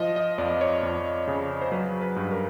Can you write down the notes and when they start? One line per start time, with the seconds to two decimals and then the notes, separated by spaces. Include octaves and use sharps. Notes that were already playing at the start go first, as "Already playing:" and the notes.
Already playing: F3 D#5
0.16 D#5
0.38 F2 D5
0.61 C#5
0.83 F2
1.28 C#3
1.61 C5
1.72 F#3 B4
2.01 B4
2.16 G2
2.31 A#4